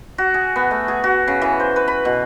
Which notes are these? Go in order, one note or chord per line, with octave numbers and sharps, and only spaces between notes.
F#4
G#4
B3
A3
G#4
F#4
C#3
E3
C5
B4
B5
B2